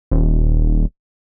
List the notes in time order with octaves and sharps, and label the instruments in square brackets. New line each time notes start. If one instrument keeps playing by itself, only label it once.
[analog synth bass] D#1